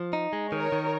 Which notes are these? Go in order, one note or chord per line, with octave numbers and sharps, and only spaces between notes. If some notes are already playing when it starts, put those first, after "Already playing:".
Already playing: F3
D#4
G#3
D#3 A#4 C#5
D#3